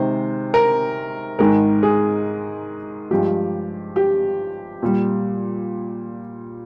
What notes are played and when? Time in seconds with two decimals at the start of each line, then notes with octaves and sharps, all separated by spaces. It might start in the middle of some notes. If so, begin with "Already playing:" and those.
Already playing: C3 D#3 G#3 C5
0.54 A#4
1.39 G#2 D#3 G#3 A#4
1.83 G#4
3.11 G2 F3 G#3 G4
3.96 G4
4.82 A#2 G3